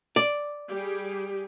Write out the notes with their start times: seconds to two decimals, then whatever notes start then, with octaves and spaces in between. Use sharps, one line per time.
0.16 D5
0.70 G3 G4 G#4